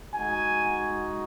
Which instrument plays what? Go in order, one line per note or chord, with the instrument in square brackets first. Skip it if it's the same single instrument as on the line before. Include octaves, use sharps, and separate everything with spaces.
[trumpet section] G#3 D#4 F#4 G#5